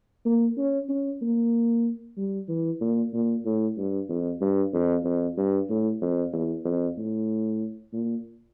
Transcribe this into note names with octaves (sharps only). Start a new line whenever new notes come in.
A#3
C#4
C#4
A#3
G3
E3
A#2
A#2
A2
G2
F2
G2
F2
F2
G2
A2
F2
E2
F2
A2
A#2